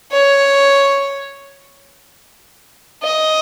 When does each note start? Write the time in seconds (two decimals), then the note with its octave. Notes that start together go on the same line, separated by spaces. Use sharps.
0.12 C#5
3.02 D#5